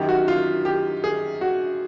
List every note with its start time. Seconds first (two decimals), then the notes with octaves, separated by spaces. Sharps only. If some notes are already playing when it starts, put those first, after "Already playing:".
Already playing: F#2 D#3 F#3 G4
0.09 F#4
0.28 F4
0.65 G4
1.04 G#4
1.41 F#4